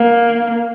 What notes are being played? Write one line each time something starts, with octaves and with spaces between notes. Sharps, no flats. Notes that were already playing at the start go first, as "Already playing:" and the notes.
Already playing: A#3